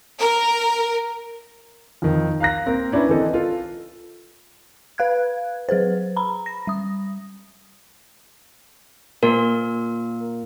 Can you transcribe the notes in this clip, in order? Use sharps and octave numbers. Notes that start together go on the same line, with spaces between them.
A#4
F2 D#3
F5 A#5 F#6 A#6
A#3 C4 A#4
C#4 D4 E4 B4
E3 C4 A4 D#5
F4 A4
B4 F5 F#6 G#6
F#3 G#4 B4 C5
A#5 B5
A#6
G3 D#6
A#2 A#4